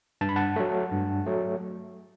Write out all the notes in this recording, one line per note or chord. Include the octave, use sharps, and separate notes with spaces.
G2 A5
B5
F#5 A5
F#3 A3
G2
F#3 A3